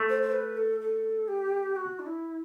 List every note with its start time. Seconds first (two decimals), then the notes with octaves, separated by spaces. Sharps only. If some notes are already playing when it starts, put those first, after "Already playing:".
Already playing: A3
0.09 C5
0.22 C5
0.33 B4
0.57 A4
0.81 A4
1.28 G4
1.76 F#4
1.99 D4
2.06 E4